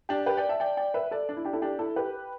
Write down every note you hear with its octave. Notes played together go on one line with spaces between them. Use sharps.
D4 G4
G4 B4
D5 G5
E5 A5
D5 G5
D5 G5
B4 E5
A4 D5
D4
E4
D4 G4
E4 A4
D4 G4
E4 A4
G4 B4